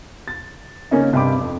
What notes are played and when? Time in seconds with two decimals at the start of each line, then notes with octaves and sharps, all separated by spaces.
0.28 A6
0.91 C#3 A#3 C#4 D#4
1.13 G2 C3 D#5 G5 B5 D6
1.41 F2